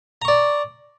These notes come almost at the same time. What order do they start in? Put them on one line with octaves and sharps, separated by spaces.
A#5 C#6 D5